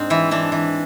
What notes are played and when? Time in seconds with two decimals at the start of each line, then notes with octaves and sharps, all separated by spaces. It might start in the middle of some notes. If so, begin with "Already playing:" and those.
Already playing: G#2 C4 D4
0.10 E3 E4
0.31 E3 D4
0.52 E3